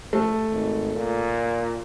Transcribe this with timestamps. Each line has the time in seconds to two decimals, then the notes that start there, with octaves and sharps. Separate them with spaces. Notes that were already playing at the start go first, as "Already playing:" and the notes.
0.13 A3 A4
0.51 G#1
0.95 A#2